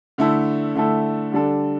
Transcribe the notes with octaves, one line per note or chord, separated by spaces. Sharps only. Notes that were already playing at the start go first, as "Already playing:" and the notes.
D3 A3 E4 A4
D3 A3 E4 A4
D3 G3 D4 A4